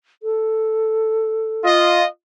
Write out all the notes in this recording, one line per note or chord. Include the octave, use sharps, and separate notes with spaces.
A4
F4 D#5